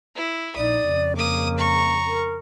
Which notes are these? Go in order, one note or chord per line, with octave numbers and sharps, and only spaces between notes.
E4
A#1 D#4 D5 D#6
F2 C#3
A#3 D6 D#6
A#5 C#6
A#4